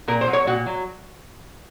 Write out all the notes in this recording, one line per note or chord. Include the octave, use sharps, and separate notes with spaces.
A#2 A#4
C5
F#3
C#5
A#2 F#4
F#3